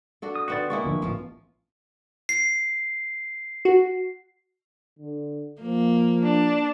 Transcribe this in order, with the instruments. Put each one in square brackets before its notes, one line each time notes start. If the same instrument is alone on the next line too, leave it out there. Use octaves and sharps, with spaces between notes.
[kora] D4 F#4 A4
[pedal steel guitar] D#6
[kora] D3 B3 C4 [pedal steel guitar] F#4 D5
[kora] G#3 A#3 E4 [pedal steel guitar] C#6
[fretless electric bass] D3 F3 B3
[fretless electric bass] A1 B3 [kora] F3 F4
[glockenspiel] C7
[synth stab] F#4
[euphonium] D3
[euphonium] F3 [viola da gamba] A#3
[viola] D4